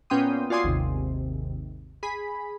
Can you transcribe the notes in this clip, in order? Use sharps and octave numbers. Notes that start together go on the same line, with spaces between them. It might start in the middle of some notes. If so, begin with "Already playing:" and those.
A#2 B3 C#4 G5 C6 D#6
F4 F#4 D5 G#5 C6 D#6
G#1 D#2 C3
G#4 B5